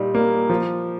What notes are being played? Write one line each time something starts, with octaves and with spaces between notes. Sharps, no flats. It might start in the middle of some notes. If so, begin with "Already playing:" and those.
Already playing: A#2 G3 D#4
A#3
F3